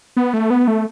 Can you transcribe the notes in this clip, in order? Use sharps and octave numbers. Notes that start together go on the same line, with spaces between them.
B3
A3
B3
A3